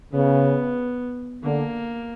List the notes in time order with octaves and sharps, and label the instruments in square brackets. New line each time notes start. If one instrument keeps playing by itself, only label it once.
[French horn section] C#3 [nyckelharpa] B3
[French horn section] D3 [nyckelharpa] A#3